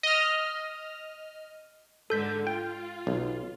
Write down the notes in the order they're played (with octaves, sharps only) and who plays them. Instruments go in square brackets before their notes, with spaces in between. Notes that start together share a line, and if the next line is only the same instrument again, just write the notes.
[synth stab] D#5 F6
[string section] G#2 D3 [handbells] A4 G6 B6
[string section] F4 [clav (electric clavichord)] G5
[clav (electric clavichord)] B1